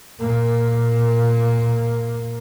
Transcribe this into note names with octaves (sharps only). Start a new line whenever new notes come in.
A#2 A#3